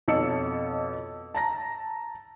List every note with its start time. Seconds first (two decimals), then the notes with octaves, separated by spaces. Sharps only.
0.08 F2 B2 C#5 A5 E6 C#7
1.34 A5 A#5 A#6